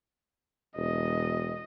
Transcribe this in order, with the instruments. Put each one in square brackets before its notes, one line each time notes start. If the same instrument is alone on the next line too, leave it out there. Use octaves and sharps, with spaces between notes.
[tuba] E1 [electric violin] D#5